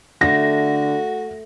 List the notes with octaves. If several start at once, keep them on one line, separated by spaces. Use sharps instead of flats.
D3 A3 F#4 A#6